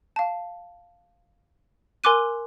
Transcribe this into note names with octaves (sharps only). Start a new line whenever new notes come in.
F5 A5
A#4 G#5 C6 D6 F#6 D#7